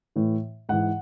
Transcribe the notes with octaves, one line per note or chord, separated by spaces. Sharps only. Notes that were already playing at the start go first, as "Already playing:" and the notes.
A2 E3
G#2 E3 F#5